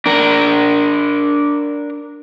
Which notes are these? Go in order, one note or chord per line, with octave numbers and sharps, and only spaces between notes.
D4 A#4